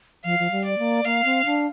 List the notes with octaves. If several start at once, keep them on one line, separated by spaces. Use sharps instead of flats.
F3 F5
F3
G3
D5
A#3
A#3 F5
C4
D4